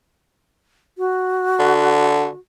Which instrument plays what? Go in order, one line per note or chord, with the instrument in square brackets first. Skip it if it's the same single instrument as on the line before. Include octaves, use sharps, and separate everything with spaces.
[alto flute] F#4
[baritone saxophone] D3